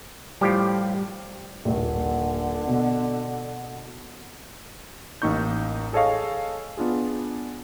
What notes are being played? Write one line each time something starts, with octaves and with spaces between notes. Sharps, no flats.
A2 F3 G3 G4
D#1 A#1 D3
B2
A1 A#3 D#4 C#6 G6
G#4 A4 C#5 D#5 F5 C#6
B3 D4 F4 G#4